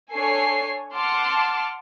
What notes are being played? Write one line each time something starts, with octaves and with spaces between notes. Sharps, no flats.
D4 A4 C#5 G#5 C7
F#5 A5 C6 D6 F6